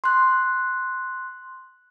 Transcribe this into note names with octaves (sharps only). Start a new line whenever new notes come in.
C6 F#6